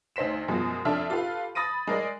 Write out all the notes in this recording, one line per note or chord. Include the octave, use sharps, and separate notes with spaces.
D2 D#4 C5 B6 E7
F#2 B2 F3 G#3
F2 D4 A4 E5 F6
F4 G4 A4 B4 F5
B5 D#6 A6 A#6 D#7
G#3 A#4 D5 D#5